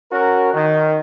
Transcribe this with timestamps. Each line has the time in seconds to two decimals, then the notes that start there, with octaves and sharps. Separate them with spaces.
0.12 C#4 F#4 A#4
0.53 D#3